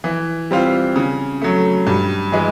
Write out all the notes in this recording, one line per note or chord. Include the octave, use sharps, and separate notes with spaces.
E3
G3 C4 F4
C#3
F#3 A3
G2
E3 G#3